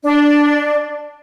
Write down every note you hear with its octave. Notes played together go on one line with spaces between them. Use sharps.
D4